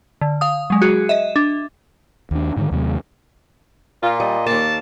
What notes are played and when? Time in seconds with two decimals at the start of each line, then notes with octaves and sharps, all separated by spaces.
0.21 D3
0.41 F5 D#6
0.70 F#3 G#3
0.82 F#4 G#4
1.09 D#5 E5
1.36 D4
2.31 D#2 D4
2.56 G#2 D3 D#3
2.71 D#2 C3 F#3 A3
4.03 A#2 F4
4.20 G3 D#5
4.46 D#2 A#3 A5